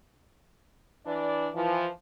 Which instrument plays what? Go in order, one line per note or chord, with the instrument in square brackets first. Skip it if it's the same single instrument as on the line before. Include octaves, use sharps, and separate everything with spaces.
[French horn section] E3 D4 D5
E3 F3